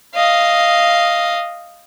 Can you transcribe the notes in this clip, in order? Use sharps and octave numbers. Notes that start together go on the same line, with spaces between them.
D#5 F5